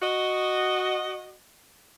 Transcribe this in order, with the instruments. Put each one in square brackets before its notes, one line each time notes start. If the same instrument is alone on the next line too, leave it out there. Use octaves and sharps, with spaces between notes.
[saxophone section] F#4 D#5